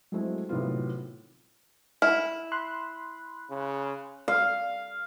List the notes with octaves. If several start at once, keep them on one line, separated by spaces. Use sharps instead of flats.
F#3 G#3 A3 C4 E4
A2 C3 D#3 F#3 B3 F4
E4 F6
B5 C6 F#6
C#3
F5